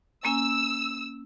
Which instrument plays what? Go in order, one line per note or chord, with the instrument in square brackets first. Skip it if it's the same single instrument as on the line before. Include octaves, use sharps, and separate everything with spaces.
[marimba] A#3 C#4 G#5 [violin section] E6